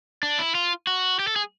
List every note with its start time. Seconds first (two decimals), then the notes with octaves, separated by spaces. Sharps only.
0.23 D4
0.39 E4
0.55 F4
0.87 F#4
1.19 G4
1.27 A4
1.36 G#4